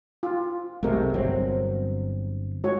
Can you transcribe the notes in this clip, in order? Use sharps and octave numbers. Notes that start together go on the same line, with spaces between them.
F4
B1 C3 G#3 A3 A#4
G1 F#3 C4
G#3 F#4 C#5